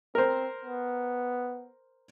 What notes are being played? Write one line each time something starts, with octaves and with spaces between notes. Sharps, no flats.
C4 A#4 C5
B3